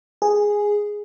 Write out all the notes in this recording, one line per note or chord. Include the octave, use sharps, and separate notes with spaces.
G#4